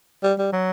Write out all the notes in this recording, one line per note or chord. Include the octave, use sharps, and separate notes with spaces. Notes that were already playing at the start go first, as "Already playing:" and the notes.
G3
G3
F#3